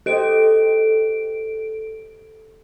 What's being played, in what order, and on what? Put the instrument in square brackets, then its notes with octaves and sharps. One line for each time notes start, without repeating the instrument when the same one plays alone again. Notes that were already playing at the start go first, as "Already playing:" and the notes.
[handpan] G4 C5 D#5 [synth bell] A4 D7